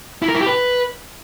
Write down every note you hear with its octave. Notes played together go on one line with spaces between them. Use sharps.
E4
A#4
E4
G4
B4